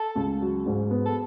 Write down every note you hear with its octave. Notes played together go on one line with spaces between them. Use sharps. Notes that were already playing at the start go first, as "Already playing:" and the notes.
Already playing: A4
C#2
F#3
G#2
B3
A4